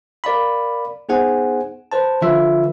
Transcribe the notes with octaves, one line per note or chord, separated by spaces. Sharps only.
A#4 D5 F5 B5
B3 D#4 G#4 C5 F#5 G#5
B4 C5 A5
D3 F3 F4 B4 E5